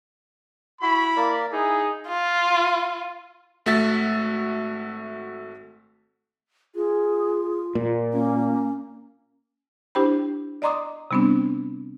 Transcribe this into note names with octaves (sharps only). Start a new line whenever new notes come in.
E4 F#4 B5
A#3 A#4 D5
D#4 E4 G#4
F4
G#1 A3 F#4 E5 A6 B6
F4 G#4
A#2
A#3 C#4
D4 E4 G4 C5 G5 B5
D5 D#5 A#5 C6 D6 D#6
C3 G3 B3 C4 D4